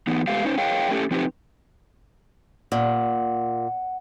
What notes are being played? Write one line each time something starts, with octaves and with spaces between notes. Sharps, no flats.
E3 B3 D#4
G#3 A3 B3 G4 F5
C#4 D#4 C5
G#4 C#5 F5 G5
A3 C#4 G4 A4
F3 C4 D#4 G4 B4
A#2 F#5